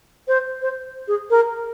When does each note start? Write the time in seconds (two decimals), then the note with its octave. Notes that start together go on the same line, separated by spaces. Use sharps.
0.28 C5
0.62 C5
1.08 G#4
1.30 A#4